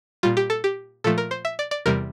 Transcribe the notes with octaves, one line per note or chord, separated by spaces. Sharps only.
A#2 G3 F4
G4
A4
G4
A#2 F3 A3 A4
A#4
C5
E5
D5
D5
E2 C3 G3 A#4